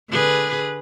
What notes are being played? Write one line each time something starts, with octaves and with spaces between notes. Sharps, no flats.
D3 G#4 B4